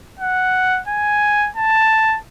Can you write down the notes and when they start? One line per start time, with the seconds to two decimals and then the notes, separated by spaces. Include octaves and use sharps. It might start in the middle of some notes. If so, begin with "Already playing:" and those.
0.19 F#5
0.88 G#5
1.56 A5